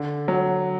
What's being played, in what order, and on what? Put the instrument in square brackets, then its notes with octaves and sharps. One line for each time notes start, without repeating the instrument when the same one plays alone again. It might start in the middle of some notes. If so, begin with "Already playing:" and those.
Already playing: [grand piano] D3
F#3